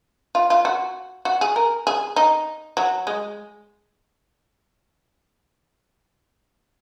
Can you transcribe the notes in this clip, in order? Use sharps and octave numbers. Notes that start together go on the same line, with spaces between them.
F4
F4
F#4
F#4
G#4
A#4
G#4
D#4
F#3
G#3